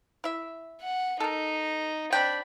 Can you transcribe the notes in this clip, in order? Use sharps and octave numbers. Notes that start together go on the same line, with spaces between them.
E4 E5
F#5
D#4 A4 A#4
C4 D4 G5 B5